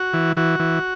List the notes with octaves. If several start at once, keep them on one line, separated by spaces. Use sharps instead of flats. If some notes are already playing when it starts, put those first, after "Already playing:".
Already playing: F#4
E3
E3 F#4
E3